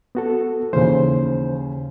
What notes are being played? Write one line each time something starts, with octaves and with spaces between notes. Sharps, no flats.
B3 F#4 A4
D#2 C#3 E3 C5